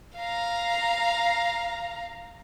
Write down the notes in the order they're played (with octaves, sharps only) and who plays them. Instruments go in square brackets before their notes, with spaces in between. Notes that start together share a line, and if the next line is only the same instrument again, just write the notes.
[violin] F5 A#5